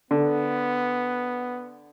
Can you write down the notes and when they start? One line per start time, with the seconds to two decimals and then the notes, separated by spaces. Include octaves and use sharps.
0.11 D3 B3